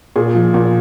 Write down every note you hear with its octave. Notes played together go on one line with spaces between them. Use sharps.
A#2 G#4
F3
A#2